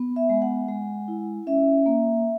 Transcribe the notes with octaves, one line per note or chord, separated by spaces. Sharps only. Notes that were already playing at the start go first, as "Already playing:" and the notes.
Already playing: B3
E5
G#3
F#5
G#3
E4
C#4 E5
A#3